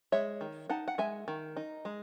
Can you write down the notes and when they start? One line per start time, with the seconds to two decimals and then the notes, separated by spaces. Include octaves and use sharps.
0.12 G#3 C#5 E5
0.41 D#3
0.70 D#4 F#5 A5
0.88 F#5
0.98 G#3 E5 G#5
1.28 D#3
1.57 D#4
1.85 G#3